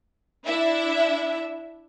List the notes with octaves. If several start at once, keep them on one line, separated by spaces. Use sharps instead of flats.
D4 E4 E5